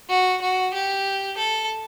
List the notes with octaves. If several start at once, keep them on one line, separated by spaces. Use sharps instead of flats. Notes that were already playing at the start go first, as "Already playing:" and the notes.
F#4
F#4
G4
A4